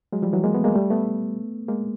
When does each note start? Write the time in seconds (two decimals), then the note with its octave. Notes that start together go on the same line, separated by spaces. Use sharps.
0.12 F#3 G#3
0.22 F3 G3
0.33 E3 F#3
0.43 G#3 A#3
0.54 A3 B3
0.64 G#3 A#3
0.75 G3 A3
0.90 A3 B3
1.68 G#3 A#3